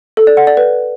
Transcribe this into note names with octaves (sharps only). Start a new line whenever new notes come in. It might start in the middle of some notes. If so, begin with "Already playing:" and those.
A4
D5
F#5
D5
B4